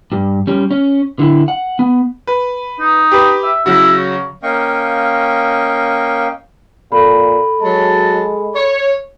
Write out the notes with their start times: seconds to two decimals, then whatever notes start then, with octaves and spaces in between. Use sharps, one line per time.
0.12 G2
0.47 G3 C#4
0.71 C#4
1.19 D3 E4
1.48 F#5
1.79 B3
2.27 B4
2.80 D#4
3.11 G4 B4
3.44 E5
3.66 C#3 F#3 E4 F#4
3.97 C#5
4.43 A#3 C#4 D#5 F5 G5 C#6
6.92 A#2 A4 B5
7.61 F#3 G#3 A5
8.55 C#5